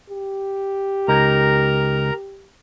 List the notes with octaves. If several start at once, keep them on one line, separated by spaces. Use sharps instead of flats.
G4
C#2 D#4 A#4 A#5